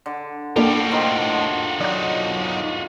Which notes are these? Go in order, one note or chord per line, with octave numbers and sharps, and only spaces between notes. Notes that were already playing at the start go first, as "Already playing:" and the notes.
D3
A2 G3 A#3 D4 F4 F#4 A4 G5
D3 D#3 F3
F#3 D#4 D5 F#6